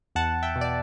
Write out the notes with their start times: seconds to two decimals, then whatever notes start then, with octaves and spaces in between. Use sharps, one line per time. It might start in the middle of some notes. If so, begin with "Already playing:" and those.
0.15 E2 F#5 A5
0.43 E5 G5
0.55 B2
0.61 D5